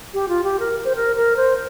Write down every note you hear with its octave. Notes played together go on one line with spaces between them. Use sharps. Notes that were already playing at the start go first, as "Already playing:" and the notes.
G4
F4
G4
A#4
C5
A#4
A#4
C5